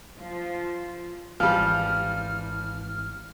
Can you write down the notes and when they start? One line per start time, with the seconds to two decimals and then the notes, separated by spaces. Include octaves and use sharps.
0.20 F3
1.40 G#1 E3 F3 G3 F5 F6